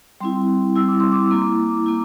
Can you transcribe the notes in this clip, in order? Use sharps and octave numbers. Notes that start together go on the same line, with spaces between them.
G3 C4 E4 C6
G3 C4 E4 E6
D6
C6
D6
A#3 E4
A#3 E4